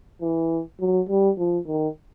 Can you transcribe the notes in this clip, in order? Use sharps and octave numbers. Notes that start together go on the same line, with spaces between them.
E3
F#3
G3
F3
D#3